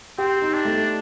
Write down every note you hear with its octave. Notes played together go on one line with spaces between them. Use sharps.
C4 G4
D#4
D4
A3